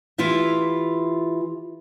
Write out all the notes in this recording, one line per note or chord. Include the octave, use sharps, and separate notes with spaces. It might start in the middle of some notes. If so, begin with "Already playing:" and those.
E3 E4 F4 G4 E5